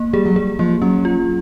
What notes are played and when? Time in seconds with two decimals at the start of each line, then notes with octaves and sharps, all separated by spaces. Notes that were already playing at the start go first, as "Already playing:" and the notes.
Already playing: A#3
0.13 G3 G#4
0.25 F#3
0.36 G3 G#4
0.59 F3 A#3
0.82 F#3 C#4
1.05 F4